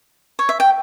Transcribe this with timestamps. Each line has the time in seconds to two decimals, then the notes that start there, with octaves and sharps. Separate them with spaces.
0.39 C#5
0.49 E5
0.60 G5